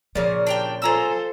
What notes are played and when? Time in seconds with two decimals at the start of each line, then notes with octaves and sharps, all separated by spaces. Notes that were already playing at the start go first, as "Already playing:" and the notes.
0.15 A#2 C#3 F3 A#4
0.47 D4 G4 G5
0.82 F4 G#4 A4 C5 A#5 E6